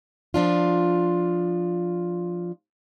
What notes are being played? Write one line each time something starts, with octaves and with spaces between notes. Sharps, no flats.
F3 D4 F4